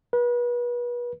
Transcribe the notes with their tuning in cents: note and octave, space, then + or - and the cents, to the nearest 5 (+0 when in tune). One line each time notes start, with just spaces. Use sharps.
B4 -35